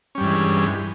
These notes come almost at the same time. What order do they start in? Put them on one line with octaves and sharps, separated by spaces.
C#4 G3 G2 E3 G#3